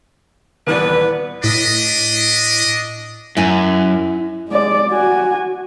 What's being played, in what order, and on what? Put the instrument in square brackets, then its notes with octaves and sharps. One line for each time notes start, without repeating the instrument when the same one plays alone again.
[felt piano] D#1 E3 D5 [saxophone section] B3 B4
[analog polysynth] A2 B6 [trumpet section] D4 D#5
[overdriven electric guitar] F#2 [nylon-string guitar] E4 G#5
[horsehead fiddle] G#3 D5
F#4 G#5